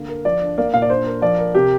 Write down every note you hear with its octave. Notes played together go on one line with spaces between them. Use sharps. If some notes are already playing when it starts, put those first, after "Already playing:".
Already playing: D3 A#3
A#4
F3 D5
D4
A#3 D5
A#2 F5
D5
D4 C5
A#4
F3 D5
A#4
C3 G4